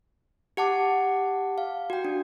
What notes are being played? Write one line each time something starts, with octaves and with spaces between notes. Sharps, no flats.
G4 F#5 A5 D6
F5
F#4 G5
D4